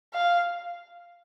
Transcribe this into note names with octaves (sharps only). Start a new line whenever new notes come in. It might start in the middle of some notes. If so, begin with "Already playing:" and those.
F5